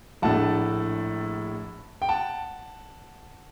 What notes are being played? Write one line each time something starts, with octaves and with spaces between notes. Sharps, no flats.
A#1 A2 A3 D4 F#5 A5
G5
F#5 A5